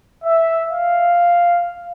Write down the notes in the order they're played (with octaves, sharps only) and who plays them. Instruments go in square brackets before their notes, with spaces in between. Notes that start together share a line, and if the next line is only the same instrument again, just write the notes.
[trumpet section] E5
F5